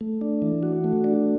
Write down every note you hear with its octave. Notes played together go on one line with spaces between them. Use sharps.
A3
D4
E3
F#4
A3
D4